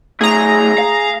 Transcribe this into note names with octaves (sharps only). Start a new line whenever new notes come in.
B1 A3 G#4 A#5
F5